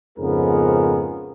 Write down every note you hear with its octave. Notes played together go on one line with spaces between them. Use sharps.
F2 G#2 C#3 B3 G#4 A#4